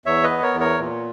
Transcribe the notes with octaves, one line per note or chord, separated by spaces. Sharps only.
E2 C#5 E5
B4 D#5
B3
A#4 C#5
E2
A#4 C#5
A#2